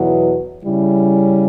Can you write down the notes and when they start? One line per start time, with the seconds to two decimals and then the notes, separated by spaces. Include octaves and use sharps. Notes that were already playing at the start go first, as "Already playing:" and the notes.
Already playing: E2 B2 F#3 B3 E4
0.65 C#3 G3 C#4 E4